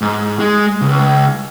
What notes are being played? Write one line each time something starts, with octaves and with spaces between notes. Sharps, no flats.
G#2
G#3
C#2